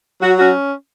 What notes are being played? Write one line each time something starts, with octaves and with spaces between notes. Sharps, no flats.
F#3 F#4
C#4 F#4